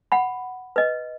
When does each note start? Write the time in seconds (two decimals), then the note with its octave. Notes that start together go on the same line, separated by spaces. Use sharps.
0.12 F#5 B5
0.76 B4 D#5